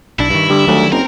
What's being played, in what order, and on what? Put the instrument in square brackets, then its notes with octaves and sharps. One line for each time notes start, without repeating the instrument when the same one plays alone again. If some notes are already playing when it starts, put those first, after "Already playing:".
[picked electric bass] B1 D4 [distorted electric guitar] E4
[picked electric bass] G2 D#3
[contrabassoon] G2 [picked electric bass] D3
[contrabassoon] D2 [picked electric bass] D#3 F#3 G3
[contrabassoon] F#1 [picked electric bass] C4 [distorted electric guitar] A#4